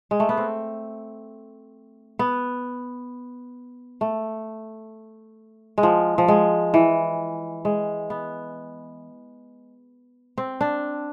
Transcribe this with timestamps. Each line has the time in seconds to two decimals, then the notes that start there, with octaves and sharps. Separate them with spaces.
0.11 G#3
0.20 A3
0.29 B3
0.37 C4
2.19 B3
4.01 A3
5.78 G#3
5.83 F3
6.18 F3
6.28 G#3
6.74 E3
7.65 G#3
8.10 B3
10.38 C4
10.61 D4